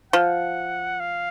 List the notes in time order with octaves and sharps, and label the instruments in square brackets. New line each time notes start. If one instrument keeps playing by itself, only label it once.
[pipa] F3 [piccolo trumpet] F#5
[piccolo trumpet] F5